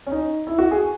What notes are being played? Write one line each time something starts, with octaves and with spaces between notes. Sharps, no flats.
C#4
D#4
E4
F#4
G#4